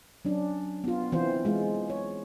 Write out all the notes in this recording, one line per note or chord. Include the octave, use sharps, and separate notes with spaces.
F#3 C#4 D4
B3 F4
E3 C4 F4 C5
G#3 F4
C#5